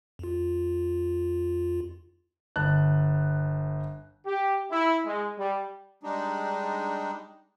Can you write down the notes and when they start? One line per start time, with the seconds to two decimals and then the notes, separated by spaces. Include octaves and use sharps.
0.19 F2 F4
2.56 G1 A5 F#6
4.26 G4
4.71 E4
5.05 G#3
5.38 G3
6.03 G3 G#3 D4 D#4